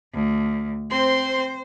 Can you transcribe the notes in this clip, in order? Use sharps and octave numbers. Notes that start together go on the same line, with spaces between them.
D2
C4 C5 C6